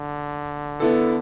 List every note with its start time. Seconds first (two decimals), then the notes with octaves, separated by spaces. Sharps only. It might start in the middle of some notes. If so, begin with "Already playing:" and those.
Already playing: D3
0.80 B3 E4 A4